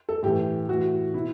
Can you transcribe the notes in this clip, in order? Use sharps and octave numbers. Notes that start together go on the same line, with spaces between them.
A4
A2 E3 G4
A2 E3 F#4
B2 E4